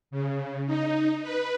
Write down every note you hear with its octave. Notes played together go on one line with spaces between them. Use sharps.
C#3
D#4
B4